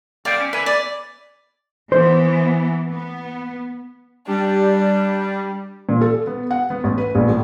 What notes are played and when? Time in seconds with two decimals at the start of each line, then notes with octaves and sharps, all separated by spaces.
0.25 G3 D5 F5 G5
0.40 C#4
0.53 B4 E5 G#5
0.66 D5
1.92 E3 B3 C5
2.90 B3
4.27 G3 D4
5.89 A#2
6.01 A4
6.27 B3
6.51 F#5
6.70 B3
6.84 A1
6.98 B4
7.15 A#1
7.29 A2